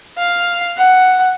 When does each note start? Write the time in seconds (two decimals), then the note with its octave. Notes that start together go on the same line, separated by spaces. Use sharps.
0.18 F5
0.77 F#5